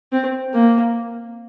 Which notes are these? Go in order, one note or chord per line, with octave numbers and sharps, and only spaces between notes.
C4
A#3